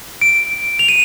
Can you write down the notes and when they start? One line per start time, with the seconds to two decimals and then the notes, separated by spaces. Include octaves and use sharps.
0.21 D7
0.79 F7
0.88 D#7